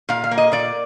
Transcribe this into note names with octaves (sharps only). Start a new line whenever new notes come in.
A#2 F5
F5
A#3
D#5
A#2 D5